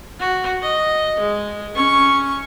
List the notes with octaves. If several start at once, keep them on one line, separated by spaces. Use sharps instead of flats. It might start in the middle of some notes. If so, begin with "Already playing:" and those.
F#4
D#5
G#3
C#4 C#6